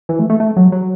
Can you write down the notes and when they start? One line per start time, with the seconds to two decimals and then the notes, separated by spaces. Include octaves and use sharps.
0.09 E3
0.19 A3
0.30 A3
0.40 A3
0.57 F#3
0.72 F#3